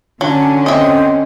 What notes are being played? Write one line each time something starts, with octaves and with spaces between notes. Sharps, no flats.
D3 F#3 C#4 D4
C4 D#5 E5